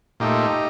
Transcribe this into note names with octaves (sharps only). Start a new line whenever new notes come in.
A#2 A3 D#4 G4